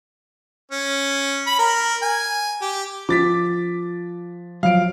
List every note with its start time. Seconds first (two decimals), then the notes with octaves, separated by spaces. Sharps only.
0.72 C#4
1.47 B5
1.59 A#4
2.02 G#5
2.61 G4
3.09 F3 D6 A6 B6
4.63 F3 F#3 F5 D7